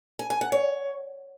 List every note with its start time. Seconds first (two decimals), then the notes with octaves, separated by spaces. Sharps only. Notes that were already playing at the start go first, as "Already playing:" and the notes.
0.19 G#5
0.30 G#5
0.41 F#5
0.52 C#5